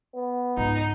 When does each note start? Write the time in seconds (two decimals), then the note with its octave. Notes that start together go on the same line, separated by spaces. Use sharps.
0.14 B3
0.57 C#2 G#2 D#4